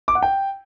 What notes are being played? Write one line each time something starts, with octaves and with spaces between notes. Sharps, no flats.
D6
F#5
G5